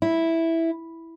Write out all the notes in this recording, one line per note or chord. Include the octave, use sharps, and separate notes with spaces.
E4